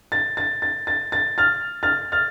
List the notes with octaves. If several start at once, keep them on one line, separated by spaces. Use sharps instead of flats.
A6
A6
A6
A6
A6
F6 A6
F6 A6
F6 A6